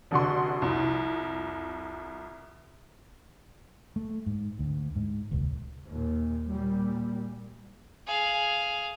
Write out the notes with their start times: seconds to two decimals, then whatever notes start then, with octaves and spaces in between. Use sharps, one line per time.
0.11 F1 D3 F#4 C6
0.62 C2 F2
3.96 A3
4.26 G#2
4.59 D2
4.96 G#2
5.31 D#1 C#2
5.87 D#2 A#2
6.49 A#2 G3
8.07 G#4 F5